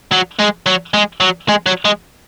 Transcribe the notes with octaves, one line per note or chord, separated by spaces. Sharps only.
F#3
G#3
F#3
G#3
F#3
G#3
F#3
G#3